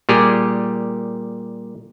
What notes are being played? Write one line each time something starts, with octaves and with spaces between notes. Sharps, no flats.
A#2 G3 G4 G#4